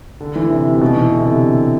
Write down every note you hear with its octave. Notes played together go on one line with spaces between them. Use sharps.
D3
E3
C3
C3
B2
E3
D3
C3
D3